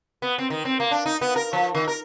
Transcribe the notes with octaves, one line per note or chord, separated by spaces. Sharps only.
B3
C4
D#3
C4
A#3
D4
D#4
B3
A#4
F3
D#3
A#4